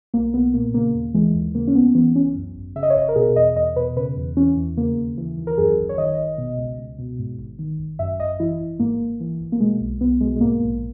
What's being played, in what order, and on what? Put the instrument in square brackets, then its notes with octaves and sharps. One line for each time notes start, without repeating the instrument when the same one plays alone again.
[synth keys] B1 A#3
B1 B3
A#2 A#3
C#3 A#3
D#2
E3 G#3
D#2
C#3 A#3
C#4
C#2 B3
E3 B3
C#2 C#4
F#2
G#1
C#3 E5
D#5
C#5
G#1 D#5
A#4
B2 G#4
E2 D#5
E2 D#5
B2 B4
C#3 B4
E2
E3 C#4
E2
C#3 A#3
D#2
E3
D#2
A#4
F#2 G#4
G#1
C#5
D#3 D#5
G#1
B2
C#2
C#2
B2
G#2
G#1
D#3
G#1
F#2 E5
G#1 D#5
E3 E4
G#1
G#2 A#3
G#1
E3
G#1
A#3
B2 G#3
B1
B1 B3
B2 G#3
G#3
G#2 A#3
A#1